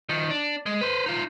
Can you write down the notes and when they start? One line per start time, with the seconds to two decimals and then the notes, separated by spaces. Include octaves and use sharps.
0.09 D#3 F3
0.30 D4
0.66 G#3
0.81 B4 C5
1.06 D#4 F4